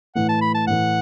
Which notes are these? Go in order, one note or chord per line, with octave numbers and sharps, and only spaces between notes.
A2 E3 A3 F#5
A5
B5
A5
A2 E3 A3 F#5